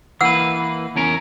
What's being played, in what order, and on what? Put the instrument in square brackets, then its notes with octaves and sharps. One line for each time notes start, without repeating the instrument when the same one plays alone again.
[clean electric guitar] E3 A#3 B4 [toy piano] F#5 E6
[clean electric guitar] E2 C#4 A#4